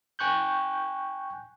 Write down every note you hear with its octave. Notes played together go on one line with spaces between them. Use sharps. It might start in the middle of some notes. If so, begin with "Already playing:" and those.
G5 G#5 C#6 F#6 G6